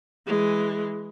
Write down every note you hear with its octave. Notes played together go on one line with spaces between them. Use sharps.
E3 G#3